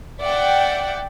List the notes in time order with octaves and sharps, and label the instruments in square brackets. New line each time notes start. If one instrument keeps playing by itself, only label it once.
[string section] D5 E5 F#5 G5